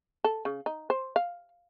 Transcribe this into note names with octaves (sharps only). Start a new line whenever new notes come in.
A4
C#3
D#4
C5
F5